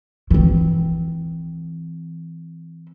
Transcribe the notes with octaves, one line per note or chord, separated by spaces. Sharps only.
E3 C4